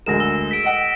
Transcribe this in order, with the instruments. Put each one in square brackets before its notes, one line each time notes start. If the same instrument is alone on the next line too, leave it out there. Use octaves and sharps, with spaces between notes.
[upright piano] D2 G#3 A#4 [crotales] A#6 E7
[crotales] E6
B6 D7
[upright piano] D#5 F#5